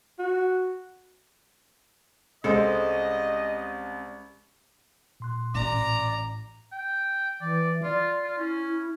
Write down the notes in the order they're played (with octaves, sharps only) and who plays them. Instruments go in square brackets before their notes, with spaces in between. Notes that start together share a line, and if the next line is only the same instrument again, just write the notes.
[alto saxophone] F#4
[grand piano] C2 C5 [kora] G#3 C#4 A4 [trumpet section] D#5
[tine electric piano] A#2 C6 F#6
[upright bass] A1 [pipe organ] D5 [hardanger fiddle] A#5
[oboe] G5
[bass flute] E3 [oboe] D5
[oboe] F4 [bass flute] D5
[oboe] F4
[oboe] C#4 [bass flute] E4